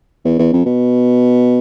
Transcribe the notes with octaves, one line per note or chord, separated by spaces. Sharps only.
E2
E2
F2
B2